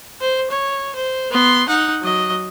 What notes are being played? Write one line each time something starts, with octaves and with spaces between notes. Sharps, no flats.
C5
C#5
C5
B3 C6
D#4 F#5
F#3 D#5